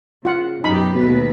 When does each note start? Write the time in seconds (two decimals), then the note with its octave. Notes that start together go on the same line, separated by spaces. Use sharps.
0.25 C#3 F4 F#5
0.64 F#2 B2 D#4 G4 B5
0.94 D#2 B2 A3 B4